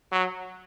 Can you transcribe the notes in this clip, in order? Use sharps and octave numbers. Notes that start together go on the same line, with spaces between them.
F#3